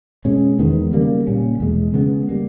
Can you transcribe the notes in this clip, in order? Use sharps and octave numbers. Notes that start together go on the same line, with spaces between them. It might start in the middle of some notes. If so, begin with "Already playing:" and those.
B2 G#3 C#4
E2 D#3 G#3 B3
C#3 G3 A#3
A#2 G3 C#4
E2 B2 G#3
C#3 G#3 B3
G3 A#3